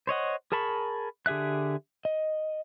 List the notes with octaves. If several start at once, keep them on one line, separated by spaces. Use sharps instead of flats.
C5 C#5 D#5 F#5
G#4 A#4 A5 B5 C#6
D3 G4 G#4 E5 F#6
D#5